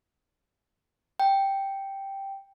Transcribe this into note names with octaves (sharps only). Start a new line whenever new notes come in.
G5